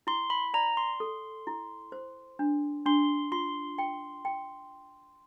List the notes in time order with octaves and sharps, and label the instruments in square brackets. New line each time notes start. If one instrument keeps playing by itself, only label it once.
[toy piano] E4 [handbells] C6
[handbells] B5
[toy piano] D5 [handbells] A#5
[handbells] C6
[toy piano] A4
E4
C5
D4
[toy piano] D4 [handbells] C6
[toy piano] F4 [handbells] C6
[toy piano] G5
G5